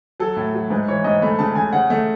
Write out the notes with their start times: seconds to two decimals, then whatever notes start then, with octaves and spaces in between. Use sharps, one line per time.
0.20 F#3 A4
0.36 A2
0.54 F#3
0.70 G#2 B4
0.88 E3 C#5
1.04 G#2 D#5
1.21 A3 B5
1.39 C#3 A5
1.55 C#3 G#5
1.73 C#3 F#5
1.90 A3